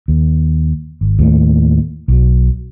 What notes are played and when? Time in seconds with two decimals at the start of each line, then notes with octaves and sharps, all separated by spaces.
0.08 D#2
1.01 G#1
1.19 D#2 A2 A3
2.08 B1 F#3